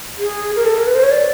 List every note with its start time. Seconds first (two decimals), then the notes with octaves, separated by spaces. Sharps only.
0.19 G#4
0.56 A#4
0.65 A4
0.78 A#4
0.87 B4
0.95 C5
1.03 C#5
1.12 D5